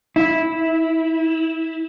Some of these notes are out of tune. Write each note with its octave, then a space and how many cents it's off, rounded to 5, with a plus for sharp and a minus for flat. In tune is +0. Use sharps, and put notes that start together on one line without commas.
E4 -10